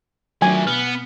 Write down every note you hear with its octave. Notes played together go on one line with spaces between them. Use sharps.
D#3 F#3 A3 D4 E5 G#5
B2 B3 F6